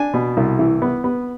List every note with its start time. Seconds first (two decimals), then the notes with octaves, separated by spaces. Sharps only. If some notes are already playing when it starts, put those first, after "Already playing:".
Already playing: D4 G#5
0.14 B2
0.37 C2
0.59 E3
0.82 B3
1.04 B3